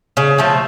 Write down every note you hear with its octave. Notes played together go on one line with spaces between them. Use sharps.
C#3
F3 A3